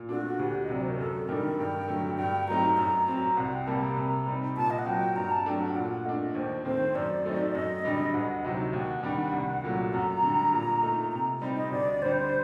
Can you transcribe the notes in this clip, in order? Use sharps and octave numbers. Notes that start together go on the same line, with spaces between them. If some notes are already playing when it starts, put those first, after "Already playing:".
Already playing: A#2
A3 D4 F#4
D2 G4
D#5
C3 F#3 D5
C5
A#4
F#2 A4
D#3 G3 D4 A#4
G2 G5
D3 F#3 A3
G2 G5
F#3 A3 C4 D#4 A#5
F#2 A#5
F#3 C4 A#5
C2 F#5
G5
C3 G3 A#3 A5
A#5
C3
G3 C4 D#4
A#2 A5
D#5
F#5
F#3 C4 G5
G2 A#5
A5
F#3 A3 D4 G5
F#5
A#2 F#5
A3 D4 D#5
D#2 C5
D#3 A3 C4 C5
F#2 D5
F#3 A3 C4 D#4
F#2 D#5
D3 G3 D4
D2 F#5
C3 F#3 C4 D#4 D#5
D#2 F#5
D#3 G3 D4
C2
A#2 F#3 A3
F#2 A#5
D3 G3
A#2
A3 D#4
C3 A#5
G3 C4 D#4
D#5
D2 D5
D3 G3 C5